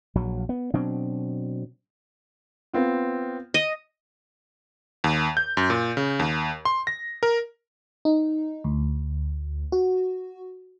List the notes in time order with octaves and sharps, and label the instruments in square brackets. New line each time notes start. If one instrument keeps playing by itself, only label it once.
[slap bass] A#1 F#3
B3
B2 F#3 C4 D4
[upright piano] B3 C4 F4
[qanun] D#5
[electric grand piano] D#2
G6
F#2
A#2
C#3
D#2
C6
A#6
A#4
[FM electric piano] D#4
D2
F#4